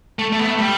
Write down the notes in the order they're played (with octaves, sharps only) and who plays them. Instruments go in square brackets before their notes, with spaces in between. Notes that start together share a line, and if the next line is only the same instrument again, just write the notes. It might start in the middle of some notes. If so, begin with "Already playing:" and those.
[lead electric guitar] A3
A3
B3
A3
G3